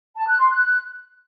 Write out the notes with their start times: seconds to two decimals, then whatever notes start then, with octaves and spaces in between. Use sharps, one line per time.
0.16 A5
0.28 F#6
0.39 C6
0.50 F#6